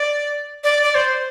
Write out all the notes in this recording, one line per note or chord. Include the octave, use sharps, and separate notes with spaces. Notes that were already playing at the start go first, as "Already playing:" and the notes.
Already playing: D5
D5
D5
C5